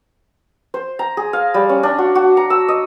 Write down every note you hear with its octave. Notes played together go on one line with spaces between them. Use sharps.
C5
A#5
G#4
F5
G3
C#4
D4
F#4
F#4
A#5
E6
D#5